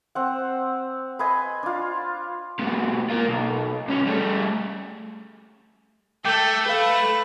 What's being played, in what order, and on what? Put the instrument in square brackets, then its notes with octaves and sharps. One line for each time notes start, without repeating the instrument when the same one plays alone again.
[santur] C4 F#5
B4 D#5 G#5 C6
D4 F4
[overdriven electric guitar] G#2 B2
A#3 F4
B1
D2 C#4
G3 A3
[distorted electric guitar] A3 [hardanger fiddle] A4 [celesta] G5 D6 G6
[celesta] A4 F5 [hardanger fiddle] B4